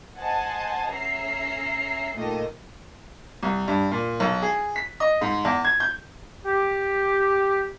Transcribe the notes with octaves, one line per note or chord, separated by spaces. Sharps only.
C5 D#5 F#5 G#5 A5
C#4 E5 A#5 C7
A#2 D#3 A3 A#3 A4 D#5
C2
G2
A#2
B1
G#4
B6
D#5
G#2
E2
G#6
G6
G4